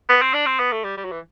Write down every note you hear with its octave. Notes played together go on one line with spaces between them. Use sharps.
B3
C4
D4
C4
B3
A3
G3
G3
F#3
E3